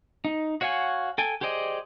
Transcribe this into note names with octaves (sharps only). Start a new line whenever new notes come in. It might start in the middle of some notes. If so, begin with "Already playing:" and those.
D#4
F#4 C#5 F5 F#5 G#5
A4 G5 G#5
G4 G#4 C5 D5 D#5